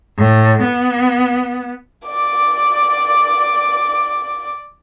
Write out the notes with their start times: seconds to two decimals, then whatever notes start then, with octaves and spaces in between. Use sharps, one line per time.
0.18 A2
0.63 B3
2.08 D5 D6